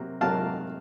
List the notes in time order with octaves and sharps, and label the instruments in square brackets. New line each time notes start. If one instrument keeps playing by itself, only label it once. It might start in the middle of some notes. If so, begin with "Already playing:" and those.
Already playing: [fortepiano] C3 F#3 A#3
C3 F#3 A#3 F5 A5